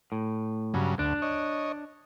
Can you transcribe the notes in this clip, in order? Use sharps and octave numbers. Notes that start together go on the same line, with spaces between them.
A2
G2 C#3 F#3
D2 D4
C#5 D#5